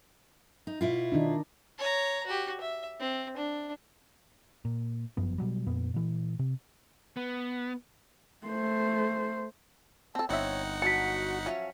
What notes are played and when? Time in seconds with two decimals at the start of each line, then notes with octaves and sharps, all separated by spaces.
0.67 D#4
0.81 B2 E4 F4
1.12 D#3 D4 D#4
1.78 C#5 A#5
2.26 F#4 G4
2.60 E5
3.00 C4
3.36 D4
4.65 A#2
5.17 G1 F#2 F3 B3
5.38 B2 F#3 G3
5.67 F2 A#2 B3
5.94 A#2 E3
6.39 C3
7.17 B3
8.47 A3 C5
10.15 C4 A4 A5
10.29 G1 C4 D#4 C5 C#5 E5 F#5
10.82 F#3 F#4 A5 B6 C#7
11.46 F3 F#3 C#4 E5